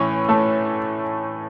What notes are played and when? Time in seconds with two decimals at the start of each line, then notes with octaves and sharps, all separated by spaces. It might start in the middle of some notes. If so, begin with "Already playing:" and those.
Already playing: A2 E3 C#4 C#5
0.29 A3 A4